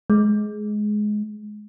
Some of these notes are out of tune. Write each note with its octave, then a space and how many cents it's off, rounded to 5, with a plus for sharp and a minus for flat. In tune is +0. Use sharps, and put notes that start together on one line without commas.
G#3 +15